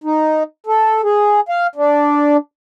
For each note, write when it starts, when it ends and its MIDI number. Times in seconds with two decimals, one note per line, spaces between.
0.04 0.43 63
0.67 1.01 69
1.04 1.40 68
1.49 1.67 77
1.76 2.37 62